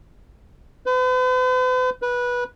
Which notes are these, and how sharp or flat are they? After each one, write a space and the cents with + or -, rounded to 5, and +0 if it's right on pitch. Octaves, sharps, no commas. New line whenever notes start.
B4 +45
B4 -15